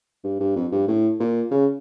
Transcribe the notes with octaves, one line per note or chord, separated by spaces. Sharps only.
G2
G2
F2
G2
A2
A#2
C#3